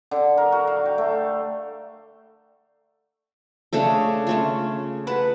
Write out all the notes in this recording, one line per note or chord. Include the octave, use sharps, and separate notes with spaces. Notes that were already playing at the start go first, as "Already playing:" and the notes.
D3
A#4
F#4
F5
G5
A3
C#3 A3 D4 A4
A3 C#4 F4
B4 F#5 A5